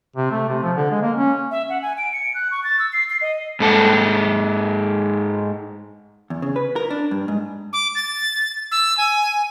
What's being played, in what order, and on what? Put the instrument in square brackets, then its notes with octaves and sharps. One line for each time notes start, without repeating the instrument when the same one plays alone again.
[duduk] C3
A3
C3
F3
D3
G#3
A#3
C#4
[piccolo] E5
F#5
G#5
D7
C#7
F#6
C#6
A6
E6
C7
C7
D#5
[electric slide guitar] G#2 A4 F#5
[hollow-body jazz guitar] E2
C#3
B4
A#4
D4
G2
G#2
[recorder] D6
A6
E6
G#5